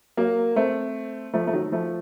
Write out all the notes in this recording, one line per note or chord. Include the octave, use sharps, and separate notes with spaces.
F#3 A#3
A3 C4
F3 A3
A3
D#3 F#3
F3 A3